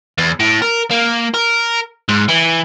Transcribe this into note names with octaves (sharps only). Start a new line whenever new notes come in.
E2
A2
A#4
A#3
A#4
G#2
E3